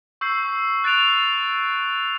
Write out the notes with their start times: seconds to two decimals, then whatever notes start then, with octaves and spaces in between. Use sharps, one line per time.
0.21 C#6 E6 G6 C7
0.84 F#6 A6 D7 F7